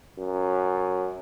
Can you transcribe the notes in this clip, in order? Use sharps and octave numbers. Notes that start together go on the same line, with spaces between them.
F#2